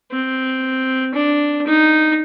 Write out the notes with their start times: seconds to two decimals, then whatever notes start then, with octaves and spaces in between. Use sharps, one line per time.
0.12 C4
1.14 D4
1.66 D#4